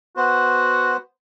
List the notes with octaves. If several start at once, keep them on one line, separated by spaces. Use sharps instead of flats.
B3 F#4 C5